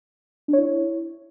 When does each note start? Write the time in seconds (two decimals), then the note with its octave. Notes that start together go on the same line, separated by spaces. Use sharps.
0.48 D4
0.53 C#5
0.58 E4